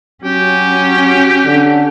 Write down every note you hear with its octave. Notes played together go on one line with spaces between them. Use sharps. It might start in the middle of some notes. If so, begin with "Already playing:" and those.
F#3 C#4 G4
D3